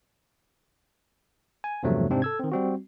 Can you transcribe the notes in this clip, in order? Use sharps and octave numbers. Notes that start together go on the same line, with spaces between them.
G#5
E2 G2 C3 F3 F#3 A3
G#2 C3 C4 D4
A4 E6 G#6
D#3 C4
G3 C4 F#4